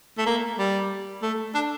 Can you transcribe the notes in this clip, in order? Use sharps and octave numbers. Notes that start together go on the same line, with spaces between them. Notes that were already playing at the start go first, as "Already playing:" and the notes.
A3
A#3
G3
A3
D4